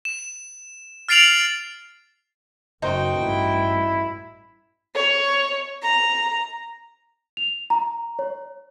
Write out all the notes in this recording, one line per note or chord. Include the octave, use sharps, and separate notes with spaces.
E7
F6 A6 C7 D7 F7 F#7
F#1 D#4 F#4 C5 G5 A#5
A1 G2 E4
C#5
A#5
F7
A#5
C#5